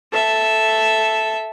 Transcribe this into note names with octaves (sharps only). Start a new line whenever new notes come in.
A4 E5